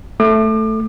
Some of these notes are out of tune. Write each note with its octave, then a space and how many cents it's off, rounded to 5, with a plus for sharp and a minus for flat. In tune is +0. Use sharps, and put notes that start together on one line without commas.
A3 +0 D6 +35